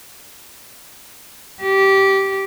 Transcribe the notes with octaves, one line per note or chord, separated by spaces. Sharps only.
G4